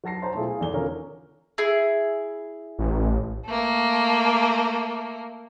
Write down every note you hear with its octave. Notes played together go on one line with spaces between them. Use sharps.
F#3 F#5 A5 A#6 C7
C5 C#5 A5 A#5 C6
B2 A3 E4 F4 G#4
G#4 F5
G#1 E2 A4 D5 G7
D3 D#3 C#4 F4 A4 A#4
E4 G#4
A1
A3 A#3